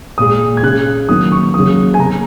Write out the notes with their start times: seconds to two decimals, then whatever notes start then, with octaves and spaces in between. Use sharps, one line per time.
0.18 A#2 G#3 D#6
0.57 G#6
0.63 C#3 G#3 F#6
1.09 D#3 F#3 A#3 D#6
1.32 C#6
1.54 C#3 F#3 A#3 D#6
1.94 G#5
1.99 C#3 A#3 A#5